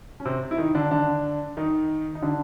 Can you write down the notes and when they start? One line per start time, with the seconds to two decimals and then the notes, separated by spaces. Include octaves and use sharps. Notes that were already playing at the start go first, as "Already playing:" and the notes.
0.20 C#4
0.25 C3 C4
0.51 E4
0.58 D#3 D#4
0.75 D3 D4
0.91 D3 D4
1.57 D#3 D#4
2.15 D#4
2.22 D3 D4